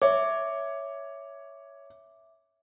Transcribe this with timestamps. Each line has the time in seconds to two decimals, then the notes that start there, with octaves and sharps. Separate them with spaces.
0.02 C#5 E5 D6